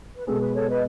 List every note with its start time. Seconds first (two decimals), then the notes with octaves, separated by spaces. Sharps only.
0.15 B4
0.26 B2 G#3 B3 A4
0.41 B4
0.54 A4 C#5
0.69 B4 D#5